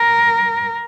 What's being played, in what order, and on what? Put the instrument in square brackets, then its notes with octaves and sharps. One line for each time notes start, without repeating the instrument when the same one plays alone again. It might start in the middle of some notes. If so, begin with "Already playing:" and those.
Already playing: [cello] A#4